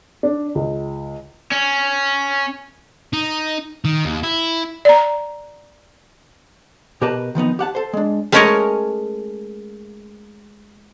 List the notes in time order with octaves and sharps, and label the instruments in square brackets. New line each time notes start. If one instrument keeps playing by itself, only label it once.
[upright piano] D4
C#2
[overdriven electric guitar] C#4
[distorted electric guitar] D#4
D#3
D#2
E4
[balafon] D5 A#5
[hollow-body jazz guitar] B2 G4 A#4 B4 A5
D#3 F3 B3 D#4
G4 F#5 A5
A4 C5
G#3 D4
[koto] G#3 A3 C#4 A#4 C#5 D#5